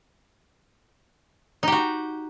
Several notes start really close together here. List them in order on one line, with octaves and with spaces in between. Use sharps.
D#4 G4 F#4